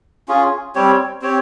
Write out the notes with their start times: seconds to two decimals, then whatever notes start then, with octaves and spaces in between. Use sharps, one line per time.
0.28 C#4 F4 G#4
0.75 G3 C4 G4 C#5
1.22 C4 G4 C#5